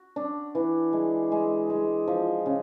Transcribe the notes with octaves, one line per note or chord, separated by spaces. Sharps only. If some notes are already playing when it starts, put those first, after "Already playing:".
Already playing: F#4
D4
E3
G#3
G#3
G#3
F3
C#3